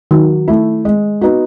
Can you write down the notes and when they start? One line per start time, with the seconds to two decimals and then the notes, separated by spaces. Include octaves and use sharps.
0.11 D#3 F#3
0.48 A3 E4
0.85 G#3
1.21 B3 D#4 F#4